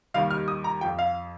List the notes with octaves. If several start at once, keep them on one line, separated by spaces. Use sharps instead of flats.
D#2 D#3 G3 F5
F6
D#6
A#5
F2 F3 G5
F5